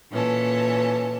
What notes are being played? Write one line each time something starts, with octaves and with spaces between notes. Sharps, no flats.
A#2 E3 C#4 A4